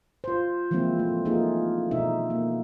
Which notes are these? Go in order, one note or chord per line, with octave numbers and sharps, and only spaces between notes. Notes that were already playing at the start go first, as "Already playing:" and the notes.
F4 C5
E3 F3 G#3 A#3 C4 E4
A3
A3 A#3 D#4 F4 G#4
B2 D#4 E5
A#3